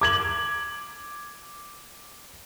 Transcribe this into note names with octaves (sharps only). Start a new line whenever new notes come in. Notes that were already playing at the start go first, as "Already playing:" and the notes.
D6 G#6 F#7